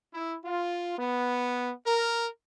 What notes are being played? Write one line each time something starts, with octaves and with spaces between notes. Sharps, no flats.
E4
F4
B3
A#4